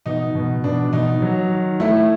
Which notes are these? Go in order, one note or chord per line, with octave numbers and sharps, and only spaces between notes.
B2 D#4
B2
B2 D4
B2 D#4
F#3
D#3
A3 E4